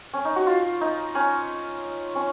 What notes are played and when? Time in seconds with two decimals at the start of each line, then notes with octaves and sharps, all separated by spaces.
0.14 C#4
0.25 D#4
0.36 F#4
0.47 F4
0.81 D#4
1.15 C#4
2.15 C#4